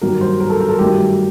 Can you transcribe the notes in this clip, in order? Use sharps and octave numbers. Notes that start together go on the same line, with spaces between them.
G2 D#3 F#3 A#3 A#4
C5
A#4
A4
A#4
A4
G2 D#3 F#3 A3 G4